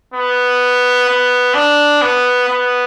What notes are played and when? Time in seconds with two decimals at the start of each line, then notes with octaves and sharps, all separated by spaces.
0.14 B3
1.08 B3
1.54 D4
2.02 B3
2.49 B3